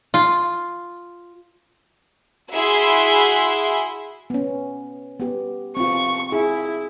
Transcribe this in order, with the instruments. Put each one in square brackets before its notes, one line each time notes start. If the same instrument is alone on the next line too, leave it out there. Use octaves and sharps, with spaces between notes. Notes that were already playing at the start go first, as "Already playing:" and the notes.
[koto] F4
[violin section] E4 F#4 G#4 E5 B5 C6
[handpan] B3 C#4
B3 G4
[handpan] C4 F4 [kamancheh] C#6
[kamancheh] E4 [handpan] G#4